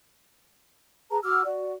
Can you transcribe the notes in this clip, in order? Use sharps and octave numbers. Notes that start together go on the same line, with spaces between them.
G#4 B4 A5 A#5
F#4 D6 E6 F6
F#4 D5